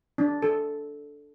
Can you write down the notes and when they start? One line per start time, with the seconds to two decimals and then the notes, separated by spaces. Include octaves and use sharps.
0.18 D4
0.42 A4